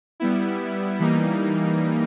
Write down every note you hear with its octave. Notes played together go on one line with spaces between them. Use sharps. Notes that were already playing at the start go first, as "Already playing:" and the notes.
G3 B3 E4
E3 G3 A#3 D#4